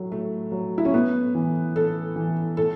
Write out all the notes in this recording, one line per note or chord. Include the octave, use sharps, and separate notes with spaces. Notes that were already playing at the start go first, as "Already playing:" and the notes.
Already playing: A2 F#3
A2 A3
F#3
E4
C#4
A2 B3
E3
A2 A4
E3
A2 A4